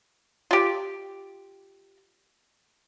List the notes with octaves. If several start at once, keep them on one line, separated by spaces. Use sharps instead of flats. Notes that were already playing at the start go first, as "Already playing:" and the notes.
F4 G4